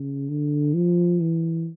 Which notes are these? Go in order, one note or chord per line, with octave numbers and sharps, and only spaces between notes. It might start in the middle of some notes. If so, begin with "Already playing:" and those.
Already playing: C#3
D3
F3
E3